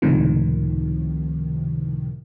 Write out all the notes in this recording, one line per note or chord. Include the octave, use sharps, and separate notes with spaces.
C#2 A2 C3 D#3 F3